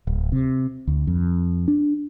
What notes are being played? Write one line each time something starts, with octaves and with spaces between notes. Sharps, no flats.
D1
C3
D2
F2
D4